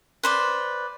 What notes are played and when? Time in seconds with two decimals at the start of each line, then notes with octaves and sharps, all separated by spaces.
0.23 B4 C5 D5